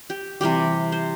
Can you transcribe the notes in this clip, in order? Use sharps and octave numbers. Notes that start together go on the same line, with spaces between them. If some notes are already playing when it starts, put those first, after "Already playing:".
G4
C3 E3 G3 G4
C5